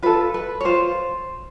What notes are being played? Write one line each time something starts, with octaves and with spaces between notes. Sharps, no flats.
F4 A4 B4
B4
C#5
F4 C5